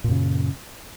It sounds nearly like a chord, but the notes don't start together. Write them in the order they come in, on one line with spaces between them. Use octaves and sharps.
A#2 F#2 C#3